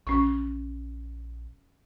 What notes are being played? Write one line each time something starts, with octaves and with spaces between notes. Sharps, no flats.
A#1 C#4 C#6